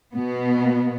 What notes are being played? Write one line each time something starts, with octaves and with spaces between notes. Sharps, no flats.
B2 B3